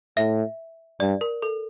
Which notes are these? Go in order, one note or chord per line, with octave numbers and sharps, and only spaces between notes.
A2 E5
G2 D5
A#4
A4